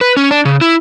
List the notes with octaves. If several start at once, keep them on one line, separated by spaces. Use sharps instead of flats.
B4
C#4
D4
C#3
E4